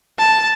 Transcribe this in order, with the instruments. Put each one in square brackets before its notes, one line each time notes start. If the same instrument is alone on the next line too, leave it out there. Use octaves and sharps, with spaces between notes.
[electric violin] A5